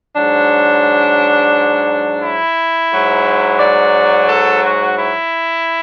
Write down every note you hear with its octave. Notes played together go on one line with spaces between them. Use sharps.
G#2 F#3 D4
E4
G#2 F#3
D5
A4
F#4
E4